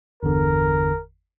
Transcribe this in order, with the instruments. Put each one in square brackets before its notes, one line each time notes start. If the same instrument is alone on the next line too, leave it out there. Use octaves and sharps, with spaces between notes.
[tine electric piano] G1 E2 D3 [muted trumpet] A#4